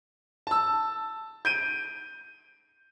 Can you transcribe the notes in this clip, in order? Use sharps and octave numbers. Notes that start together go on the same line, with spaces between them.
A5 E6
G6 D7 D#7